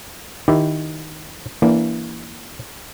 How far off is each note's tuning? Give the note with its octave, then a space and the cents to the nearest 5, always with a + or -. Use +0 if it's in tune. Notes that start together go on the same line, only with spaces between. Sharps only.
D#3 +0 E4 +0 G4 -15
E3 +0 A#3 +0 D4 -30